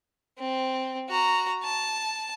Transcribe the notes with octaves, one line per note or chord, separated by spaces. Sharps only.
C4
F#4 A#5
A5